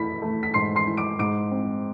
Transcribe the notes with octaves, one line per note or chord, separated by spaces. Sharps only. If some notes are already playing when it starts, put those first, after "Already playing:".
Already playing: A3 E4 B5 B6
A3
B6
G#2 C6 C7
C6 C7
E4
D6 D7
G#2 D6 D7
C4